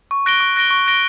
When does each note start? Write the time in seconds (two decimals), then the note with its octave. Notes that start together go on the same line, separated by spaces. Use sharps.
0.11 C#6
0.26 F#6 A#6 D7 G7
0.40 C#6
0.56 F#6 A#6 D7 G7
0.70 C#6
0.86 F#6 A#6 D7 G7